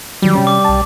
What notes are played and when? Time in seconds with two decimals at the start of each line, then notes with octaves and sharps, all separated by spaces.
0.22 D#3 F#3 G3
0.35 C3 C#4
0.47 D6
0.64 B1 A5